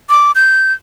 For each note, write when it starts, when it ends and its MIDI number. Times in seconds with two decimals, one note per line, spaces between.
0.10 0.32 86
0.35 0.73 91